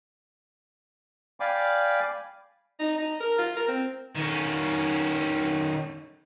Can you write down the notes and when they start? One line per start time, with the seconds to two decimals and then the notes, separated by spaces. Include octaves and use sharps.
1.40 D5 F5 G5 G#5 B5 D6
2.80 D#4
2.98 D#4
3.20 A#4
3.38 F4
3.57 A#4
3.68 C4
4.15 D#3 C#4